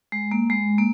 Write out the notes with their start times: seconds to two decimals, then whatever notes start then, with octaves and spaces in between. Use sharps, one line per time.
0.12 G#3
0.31 A#3
0.50 G#3
0.78 A#3